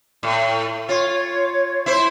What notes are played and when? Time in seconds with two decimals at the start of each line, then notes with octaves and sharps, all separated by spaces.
0.23 A2
0.89 F4 C#5
1.86 E4 C5